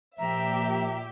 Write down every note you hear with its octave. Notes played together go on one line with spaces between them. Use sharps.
A#2 F3 G4 E5 G5 A#5